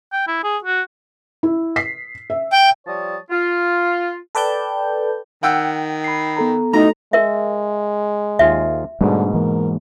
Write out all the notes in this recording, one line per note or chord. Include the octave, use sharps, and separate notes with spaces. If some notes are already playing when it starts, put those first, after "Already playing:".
G5
E4
G#4
F#4
E4
B6 C7
E5
G5
F3 G3 C#5 A5 D#6
F4
A4 B4 D5 G5 A5 G6
D#3 F#5 G5 E6
B5 C7
B3 A4 A#5
A2 A3 D#4 F#4 A4 A#5
G#3 A#4 E5
D#2 F4 G#4 E5
G#2 B2 D3 G3 A3 D4
E3 G#3 A#3 A#4